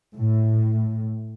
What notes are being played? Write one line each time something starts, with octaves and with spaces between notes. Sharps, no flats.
A2